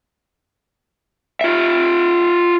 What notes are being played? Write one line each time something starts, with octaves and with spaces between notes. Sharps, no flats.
F4 E5